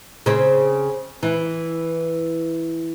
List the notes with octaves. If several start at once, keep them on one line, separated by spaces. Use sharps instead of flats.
C#3 C4
E3